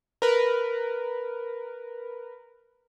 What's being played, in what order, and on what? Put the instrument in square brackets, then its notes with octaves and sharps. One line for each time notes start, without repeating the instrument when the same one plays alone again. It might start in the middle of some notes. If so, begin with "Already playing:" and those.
[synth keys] A#4 B4